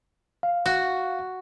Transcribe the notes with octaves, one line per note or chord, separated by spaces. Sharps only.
F5
F#4